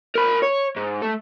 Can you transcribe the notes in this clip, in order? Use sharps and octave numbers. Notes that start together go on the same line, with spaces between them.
A#4 B5
C#5
G#2
A3